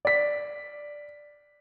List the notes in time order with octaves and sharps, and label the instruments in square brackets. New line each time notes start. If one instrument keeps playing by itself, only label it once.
[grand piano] D5 B6